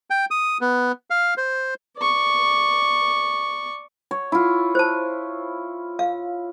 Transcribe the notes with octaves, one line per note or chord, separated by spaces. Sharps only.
G5
D#6
B3
F5
C5
D5 C#6
C#5
E4 F4
C5 A5
F5